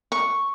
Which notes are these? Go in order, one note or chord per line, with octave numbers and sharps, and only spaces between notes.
C#6